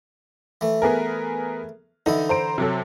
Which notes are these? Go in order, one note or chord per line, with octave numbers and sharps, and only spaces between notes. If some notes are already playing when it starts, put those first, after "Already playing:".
E3 A3
B3 G#4 A#4
D3 E3 D#4 E4
C5 A#5 D7
C3 F#3 A4